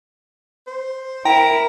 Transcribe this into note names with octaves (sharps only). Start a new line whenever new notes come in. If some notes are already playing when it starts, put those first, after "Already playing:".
C5
E4 A#4 G5 A#5